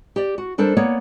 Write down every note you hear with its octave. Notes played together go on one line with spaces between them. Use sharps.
G4 D5
F#4
G3 D4 A4 A#4 C5
A#3 B3 C#5 D5